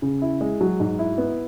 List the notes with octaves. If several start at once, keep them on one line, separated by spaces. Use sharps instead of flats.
C#3
E4
G#3
F#3
G#2
E4
B3